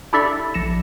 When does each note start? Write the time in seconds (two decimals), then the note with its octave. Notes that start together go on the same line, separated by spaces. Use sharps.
0.13 D4 E4 G4 A4 D5 E5
0.54 A#1 A#6 C#7 E7